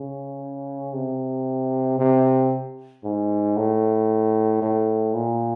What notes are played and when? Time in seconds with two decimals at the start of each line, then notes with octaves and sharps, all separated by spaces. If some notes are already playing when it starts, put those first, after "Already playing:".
Already playing: C#3
0.94 C3
1.99 C3
3.04 G#2
3.57 A2
4.62 A2
5.14 A#2